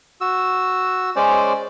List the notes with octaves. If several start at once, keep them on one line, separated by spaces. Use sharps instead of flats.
F#4 E6
G#3 C#4 C5 D5